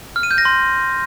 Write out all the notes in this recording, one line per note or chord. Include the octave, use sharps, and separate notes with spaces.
F6
D#7
G6
A#6
C6